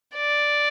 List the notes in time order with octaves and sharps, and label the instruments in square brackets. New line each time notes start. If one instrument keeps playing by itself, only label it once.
[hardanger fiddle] D5